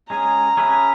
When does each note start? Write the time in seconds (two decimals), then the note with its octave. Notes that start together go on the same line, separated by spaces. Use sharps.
0.10 G#3 C#4 G#4 A#5
0.57 C#4 G#4 B4 E5